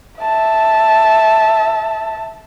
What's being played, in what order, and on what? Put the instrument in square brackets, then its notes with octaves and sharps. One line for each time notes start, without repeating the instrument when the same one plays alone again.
[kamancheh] E5 A5